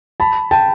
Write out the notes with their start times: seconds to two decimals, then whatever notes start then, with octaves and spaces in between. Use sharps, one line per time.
0.20 A5 B5
0.51 G5 A5